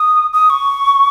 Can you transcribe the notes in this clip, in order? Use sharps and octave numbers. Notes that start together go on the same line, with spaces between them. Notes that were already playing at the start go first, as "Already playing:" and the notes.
Already playing: D#6
D#6
C#6